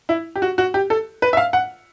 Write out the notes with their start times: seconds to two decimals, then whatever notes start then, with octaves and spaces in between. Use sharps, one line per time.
0.09 E4
0.36 G4
0.42 F#4
0.58 F#4
0.74 G4
0.90 A4
1.22 B4
1.33 E5
1.37 F5
1.53 F#5